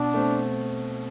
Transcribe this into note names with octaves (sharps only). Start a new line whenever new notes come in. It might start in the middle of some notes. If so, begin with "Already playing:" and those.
Already playing: B2 D4
A3 C4